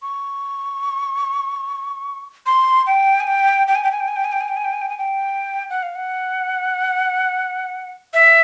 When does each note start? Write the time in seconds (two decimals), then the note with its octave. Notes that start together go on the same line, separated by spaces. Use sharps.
0.02 C#6
2.46 C6
2.87 G5
3.20 G#5
3.27 G5
3.67 G5
3.75 G#5
3.84 G5
3.91 G#5
4.00 G5
4.08 G#5
4.16 G5
4.24 G#5
4.32 G5
4.41 G#5
4.48 G5
4.57 G#5
4.64 G5
4.73 G#5
4.82 G5
4.89 G#5
4.98 G5
5.70 F#5
5.83 F5
5.96 F#5
8.14 E5